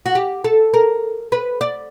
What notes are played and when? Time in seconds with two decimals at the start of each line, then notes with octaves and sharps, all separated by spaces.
0.06 F#4
0.15 G4
0.44 A4
0.74 A#4
1.32 B4
1.61 D5